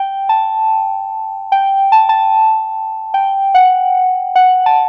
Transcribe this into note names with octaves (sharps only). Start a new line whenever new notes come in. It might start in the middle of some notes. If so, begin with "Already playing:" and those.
Already playing: G5
A5
G5
A5
A5
G5
F#5
F#5
A5